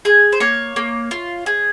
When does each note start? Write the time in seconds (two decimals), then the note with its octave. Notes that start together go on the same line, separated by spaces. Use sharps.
0.05 G#4 G#5
0.32 C5
0.40 A#3 C#5
0.76 A#3
1.11 F4
1.46 G#4